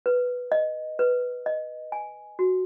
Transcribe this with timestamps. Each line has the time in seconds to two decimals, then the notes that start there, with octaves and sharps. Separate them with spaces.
0.06 B4
0.52 D#5
0.99 B4
1.46 D#5
1.92 G#5
2.39 F#4